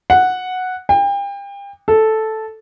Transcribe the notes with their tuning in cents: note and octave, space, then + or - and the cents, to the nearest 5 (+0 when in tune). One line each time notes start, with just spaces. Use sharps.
F#5 -5
G5 +35
A4 -5